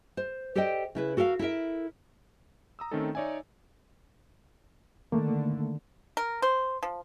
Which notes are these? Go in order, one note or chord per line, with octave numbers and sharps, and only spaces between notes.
C5
G4 A4 C5 D5 D#5 G5
C#3 E4 B4
F#4 A4 A#4 E5 F5
E4 A4 A#4 E5
A#5 D#6 E6
D#3 A3 C4 C#4 D#4 A4
D#4 C#5 D5 E5 G#5
D3 D#3 A3 A#3
A#4
C5
F3